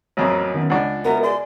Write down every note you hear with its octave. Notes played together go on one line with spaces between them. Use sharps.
A1 F2 F#3 A#3 C#5 D#5
D#3 B3 C#4
C#2 D4 F4 D#5 F#5
B3 F#4 A#4 E5
G#4 D5 C6